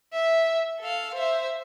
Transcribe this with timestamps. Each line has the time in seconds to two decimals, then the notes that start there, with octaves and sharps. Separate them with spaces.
0.13 E5
0.79 A4 F5
1.14 C5 E5